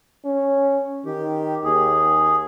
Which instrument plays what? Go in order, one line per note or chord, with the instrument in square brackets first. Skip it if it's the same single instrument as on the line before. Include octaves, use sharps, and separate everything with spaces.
[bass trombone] C#4
[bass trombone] D#3 [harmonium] G4
[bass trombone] D#2 [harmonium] G#4